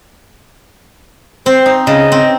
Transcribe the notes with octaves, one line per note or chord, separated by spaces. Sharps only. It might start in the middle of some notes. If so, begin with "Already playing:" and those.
C4 C5
D#4
C#3 D#5
C4